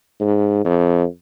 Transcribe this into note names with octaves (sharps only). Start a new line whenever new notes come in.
G#2
F2